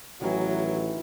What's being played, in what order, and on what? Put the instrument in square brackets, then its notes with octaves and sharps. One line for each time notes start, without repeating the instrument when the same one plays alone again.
[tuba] A1 [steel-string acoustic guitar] D#3 E3 E4 [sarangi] F#3